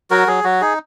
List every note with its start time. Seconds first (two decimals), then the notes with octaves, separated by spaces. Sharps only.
0.10 F#3 F#4 A#4
0.27 F#3 G#4
0.44 F#3 F#4
0.61 D#4 G#4